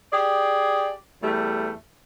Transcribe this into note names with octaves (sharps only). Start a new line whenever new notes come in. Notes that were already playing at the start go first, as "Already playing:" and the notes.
G4 G#4 D5
E2 G3 A3